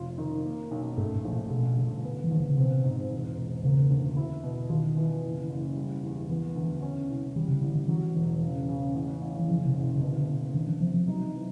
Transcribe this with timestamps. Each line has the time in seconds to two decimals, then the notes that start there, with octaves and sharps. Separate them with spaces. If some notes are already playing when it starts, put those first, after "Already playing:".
Already playing: F1 F4
0.18 D#3
0.45 A#3
0.71 B1
0.98 G#2 A3
1.16 A2
1.24 A#1
1.33 A#2
1.50 B2 A3
1.77 G1
2.03 B3
2.24 E3
2.30 A#1 D#3
2.40 D3
2.49 C#3
2.58 C3 C4
2.84 G#2
3.10 E1
3.37 E1
3.64 C#3 A#3
3.90 D2
4.17 E4
4.43 B2
4.70 D#3 F4
4.97 E3
5.23 F#1
5.50 F#1
5.76 G3
6.03 E2
6.29 E3 B3
6.56 D2
6.82 C#4
7.09 C2
7.36 D#3 G3
7.49 C#3
7.62 A1 D3
7.75 D3
7.88 E3 F#3
8.16 E1
8.41 C#3
8.68 C#3
8.94 A1
9.21 A1
9.39 E3
9.48 F#1 F3
9.65 C3
9.74 F#1
9.84 C3
9.96 C#3
10.01 B2 D3
10.27 B2
10.55 D#3 D4
10.67 E3
10.81 C3 F3
10.94 F3
11.07 F#3 D#4
11.34 E3